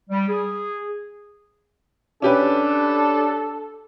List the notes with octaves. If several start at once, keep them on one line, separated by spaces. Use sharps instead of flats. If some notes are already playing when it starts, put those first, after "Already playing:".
G3
G#4
C#4 D4 G4 A4 B4